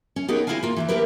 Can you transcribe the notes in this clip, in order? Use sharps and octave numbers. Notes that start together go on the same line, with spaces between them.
C#4
B3 D#4 G4 G#4 A#4 C#5
C4 C#4 E4 F4 F5 G#5
A#3 F4
E2 G#2 E3
A3 A#3 E4 G4 A#4 B4